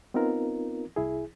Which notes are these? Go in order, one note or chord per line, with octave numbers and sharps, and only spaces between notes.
B3 C4 D#4 F4 A#4
C2 E4 G#4